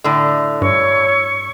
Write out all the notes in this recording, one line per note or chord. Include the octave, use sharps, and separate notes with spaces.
A2 D3
G2 C#5 C#6 E6